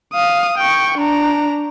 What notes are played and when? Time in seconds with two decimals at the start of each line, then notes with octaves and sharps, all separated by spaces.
0.13 F5 D#6
0.58 G5 C#6
0.98 D4 A#5